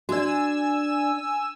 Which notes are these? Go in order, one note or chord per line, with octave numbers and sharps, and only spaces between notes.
D4 F#4 D5 G#5 E6